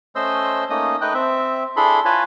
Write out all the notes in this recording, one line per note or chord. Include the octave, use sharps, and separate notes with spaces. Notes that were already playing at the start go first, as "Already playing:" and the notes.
A3 C#4 C5 D#5 C6 E6
A3 A#3 C#4 D#4 D#5 D#6
A3 D#4 B4 D#5 G5 F#6
C4 E5
D4 E4 G#4 A4 B5 C6
F4 B4 C#5 G#5 A5 B5